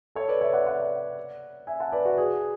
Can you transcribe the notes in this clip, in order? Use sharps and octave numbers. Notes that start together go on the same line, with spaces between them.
A4 C#5
B4 D5
C#5 E5
D5 F#5
D5 F#5
E5 G#5
F#5 A5
B4 D5
F#4
G#4